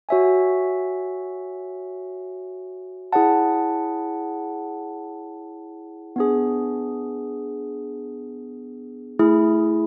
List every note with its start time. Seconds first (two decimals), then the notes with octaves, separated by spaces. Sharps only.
0.09 F#4 C#5 E5 G#5
3.13 E4 G#4 C#5 F#5 A5
6.16 B3 D4 G#4
9.19 A3 E4 G#4